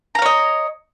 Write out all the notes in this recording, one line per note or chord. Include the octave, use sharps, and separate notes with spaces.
C#5 D#5 F5 A#5